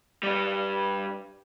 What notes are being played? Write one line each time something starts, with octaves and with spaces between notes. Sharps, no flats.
G2 G3